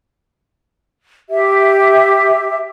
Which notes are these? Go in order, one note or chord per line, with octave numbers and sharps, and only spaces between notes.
G4 E5